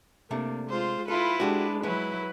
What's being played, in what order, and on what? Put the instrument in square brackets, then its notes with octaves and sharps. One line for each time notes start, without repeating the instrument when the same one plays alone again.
[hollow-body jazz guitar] C3 A3 D4 [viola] A#3
[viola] G#3 F4 [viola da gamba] C5
[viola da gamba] E4 B4 [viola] F4 [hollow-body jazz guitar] A4
[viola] G#3 D4 [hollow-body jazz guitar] F#4 G4 A4
[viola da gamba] F#3 E4 [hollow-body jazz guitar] G#3 [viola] B4